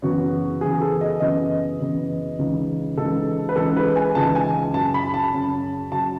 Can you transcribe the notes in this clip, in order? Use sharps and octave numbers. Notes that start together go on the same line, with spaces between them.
F#2 C#3 E3 B3 F#4
F#2 C#3 E3 B3 G#4
A4
D#5
F#2 C#3 E3 B3 D#5
F#2 C#3 E3 B3
C#2 C#3 E3 G#3 D#4
C#2 C#3 E3 G#3 D#4 A4
B4
C#2 C#3 E3 G#3 D#4 A4
B4
G#5
C#2 C#3 E3 G#3 D#4 A5
G#5
F#2 C#3 F#3 A5
B5
A5
F#2 C#3 F#3
C#3 F#3 A5